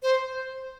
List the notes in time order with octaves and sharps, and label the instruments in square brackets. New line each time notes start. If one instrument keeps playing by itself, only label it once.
[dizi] C5